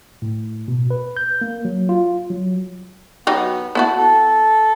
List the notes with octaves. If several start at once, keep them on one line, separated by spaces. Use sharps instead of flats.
A2
B2
B4
G6
A#3
F#3
F4
F#3
F#3 B3 D#4 G4
B3 E4 F#4 A5
A4